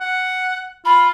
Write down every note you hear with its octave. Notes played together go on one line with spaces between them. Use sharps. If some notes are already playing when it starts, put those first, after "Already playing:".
F#5
F4 B5